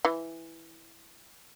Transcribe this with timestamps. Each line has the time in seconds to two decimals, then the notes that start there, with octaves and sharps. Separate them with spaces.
0.05 E3